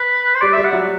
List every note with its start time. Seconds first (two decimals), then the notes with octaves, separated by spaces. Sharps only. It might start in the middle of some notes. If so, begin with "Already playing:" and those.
Already playing: B4
0.35 C5
0.41 G3 D5
0.53 G3 E5
0.64 F#5
0.73 F#3